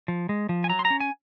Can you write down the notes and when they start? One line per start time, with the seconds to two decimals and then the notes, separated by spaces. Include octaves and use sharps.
0.08 F3
0.29 G#3
0.49 F3
0.64 G#5
0.69 F#3 A#5
0.79 C6
0.85 A#5
0.90 C#4
1.00 G#5